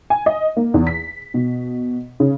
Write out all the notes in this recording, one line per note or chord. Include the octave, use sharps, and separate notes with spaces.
G#5
D#5
A#3
E2
B6
B2
C#3